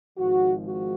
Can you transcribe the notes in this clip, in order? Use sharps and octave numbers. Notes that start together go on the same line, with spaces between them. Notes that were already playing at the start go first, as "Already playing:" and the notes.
G#1 G#2 F3 F#4
F#4